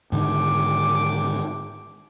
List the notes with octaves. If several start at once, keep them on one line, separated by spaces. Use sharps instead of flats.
G#2 D3 D#3 D6